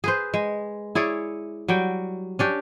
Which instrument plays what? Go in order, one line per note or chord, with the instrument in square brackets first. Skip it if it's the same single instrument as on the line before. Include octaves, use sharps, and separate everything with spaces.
[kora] G#4 B4 C5
G#3
E4 G#4 C#5 D5
F#3 G3 G5
C#4 D4 G4